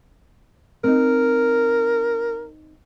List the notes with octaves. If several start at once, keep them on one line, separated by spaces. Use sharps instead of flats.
C4 D#4 A#4